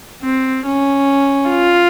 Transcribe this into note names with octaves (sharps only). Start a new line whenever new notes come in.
C4
C#4
F4